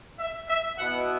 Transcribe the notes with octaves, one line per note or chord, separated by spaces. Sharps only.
E5
E5
B2 B3 E4 F#5